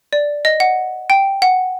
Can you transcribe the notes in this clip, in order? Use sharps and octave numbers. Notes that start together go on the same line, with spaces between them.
D5
D#5
F#5
G5
F#5